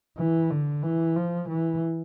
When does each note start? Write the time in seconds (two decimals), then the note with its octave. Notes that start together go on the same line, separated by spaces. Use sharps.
0.18 E3
0.50 D3
0.83 E3
1.16 F3
1.49 E3